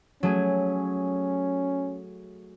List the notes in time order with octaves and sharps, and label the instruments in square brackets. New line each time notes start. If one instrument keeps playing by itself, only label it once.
[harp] F#3 A3 G#4 [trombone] C#4